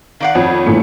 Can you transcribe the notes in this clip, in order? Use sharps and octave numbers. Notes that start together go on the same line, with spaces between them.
D#3 D5 F5 F#5
F2 C#5
G2 A#2 E3 A3